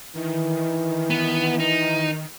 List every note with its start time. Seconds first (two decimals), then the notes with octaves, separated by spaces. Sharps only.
0.15 D#3 E3
1.10 B3
1.60 D#4